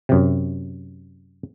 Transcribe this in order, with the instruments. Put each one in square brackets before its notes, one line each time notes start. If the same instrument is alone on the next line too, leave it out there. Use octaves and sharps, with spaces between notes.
[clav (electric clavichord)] F#2 C3